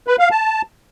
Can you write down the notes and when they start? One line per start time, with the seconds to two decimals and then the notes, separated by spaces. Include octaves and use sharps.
0.07 B4
0.19 F5
0.31 A5